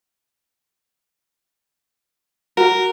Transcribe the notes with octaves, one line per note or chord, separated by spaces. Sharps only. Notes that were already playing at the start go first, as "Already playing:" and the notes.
F#4 A#4